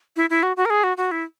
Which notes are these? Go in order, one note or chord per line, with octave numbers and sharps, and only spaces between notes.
E4
E4
F#4
F#4
A#4
G#4
F#4
F#4
E4